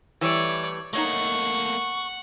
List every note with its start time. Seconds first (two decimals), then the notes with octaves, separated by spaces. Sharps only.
0.21 E3 G3 A3 C#5 D5
0.93 A3 A#3 D#4 C#5 D#5 F#5 C#6